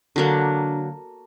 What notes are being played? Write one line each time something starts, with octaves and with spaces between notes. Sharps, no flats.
D3 F#3 A#3 D4